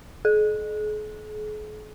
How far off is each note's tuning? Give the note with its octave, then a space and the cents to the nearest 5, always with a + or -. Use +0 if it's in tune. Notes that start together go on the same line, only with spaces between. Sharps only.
G#4 +45